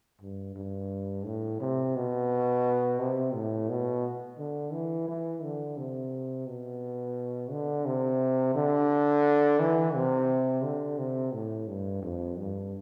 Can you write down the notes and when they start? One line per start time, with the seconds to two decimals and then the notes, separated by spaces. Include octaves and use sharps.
0.21 G2
0.56 G2
1.25 A2
1.60 C3
1.96 B2
2.99 C3
3.35 A2
3.69 B2
4.38 D3
4.73 E3
5.08 E3
5.43 D3
5.77 C3
6.47 B2
7.51 D3
7.85 C3
8.55 D3
9.60 E3
9.95 C3
10.63 D3
10.99 C3
11.34 A2
11.68 G2
12.02 F2
12.38 G2